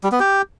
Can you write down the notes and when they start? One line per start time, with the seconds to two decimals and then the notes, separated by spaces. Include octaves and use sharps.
0.04 G3
0.12 B3
0.20 G4